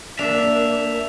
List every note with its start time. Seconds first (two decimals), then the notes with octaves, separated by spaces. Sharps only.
0.19 A#3 D4 E5 F7